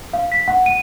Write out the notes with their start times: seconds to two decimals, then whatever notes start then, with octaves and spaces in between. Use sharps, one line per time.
0.13 F5
0.32 B6
0.48 F#5
0.66 D#7